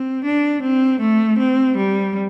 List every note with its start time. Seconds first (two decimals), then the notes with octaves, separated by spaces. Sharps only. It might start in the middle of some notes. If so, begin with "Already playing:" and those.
Already playing: C4
0.25 D4
0.62 C4
1.00 A3
1.39 C4
1.77 G3